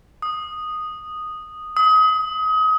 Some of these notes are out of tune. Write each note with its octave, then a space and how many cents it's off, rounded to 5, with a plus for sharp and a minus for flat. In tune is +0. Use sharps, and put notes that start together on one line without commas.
D#6 -5
D#6 +30